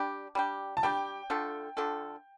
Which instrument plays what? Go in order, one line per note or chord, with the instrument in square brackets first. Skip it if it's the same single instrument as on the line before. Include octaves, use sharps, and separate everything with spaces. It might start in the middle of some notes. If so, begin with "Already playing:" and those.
Already playing: [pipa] G3 D4 G4
G3 D4 G4
[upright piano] A5
[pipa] G3 D4 G4 [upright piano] G5
[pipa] D3 A3 F4 A4
D3 A3 F4 A4